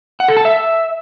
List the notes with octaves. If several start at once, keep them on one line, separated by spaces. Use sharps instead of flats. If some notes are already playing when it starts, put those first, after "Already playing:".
F#5
A4
A5
E5